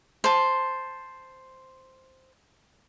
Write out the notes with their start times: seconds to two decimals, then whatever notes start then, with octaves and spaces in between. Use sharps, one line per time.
0.24 C5 A5